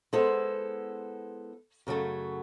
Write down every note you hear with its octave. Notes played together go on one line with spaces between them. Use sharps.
G#3 B3 E4 A4 C5
F#2 C#3 F#3 A3